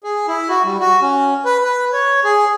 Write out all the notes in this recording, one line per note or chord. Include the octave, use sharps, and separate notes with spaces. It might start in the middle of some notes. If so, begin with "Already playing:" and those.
G#4
E4
F#4
G3
F#4
C#4
B4
B4
C#5
G#4